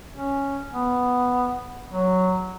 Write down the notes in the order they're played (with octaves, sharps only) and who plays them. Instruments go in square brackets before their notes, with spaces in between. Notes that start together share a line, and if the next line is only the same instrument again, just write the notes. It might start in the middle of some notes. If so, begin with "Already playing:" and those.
[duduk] C#4
B3
F#3